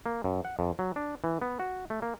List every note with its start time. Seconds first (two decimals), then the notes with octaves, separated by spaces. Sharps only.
0.06 A#3
0.24 F#2
0.45 F#5
0.59 F2
0.79 F#3
0.96 D4
1.24 E3
1.42 B3
1.60 F#4
1.90 A3
2.02 A#3